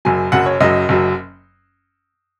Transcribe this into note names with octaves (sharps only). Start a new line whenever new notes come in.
F#1 F#2 F#3 G#5
F#1 F#2 F#3 F#5
C#5
F#1 F#2 F#3 D#5
F#1 F#2 F#3